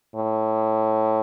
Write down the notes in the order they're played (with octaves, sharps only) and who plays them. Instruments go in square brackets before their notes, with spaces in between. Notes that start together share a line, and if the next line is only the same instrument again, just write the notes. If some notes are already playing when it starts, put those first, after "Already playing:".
[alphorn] A2